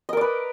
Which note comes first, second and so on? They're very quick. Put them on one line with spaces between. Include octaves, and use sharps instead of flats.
D#5 A#4 D5 B4